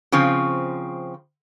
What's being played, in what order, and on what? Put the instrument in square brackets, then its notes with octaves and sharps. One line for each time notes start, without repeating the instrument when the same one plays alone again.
[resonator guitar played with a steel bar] C#3 F3 C4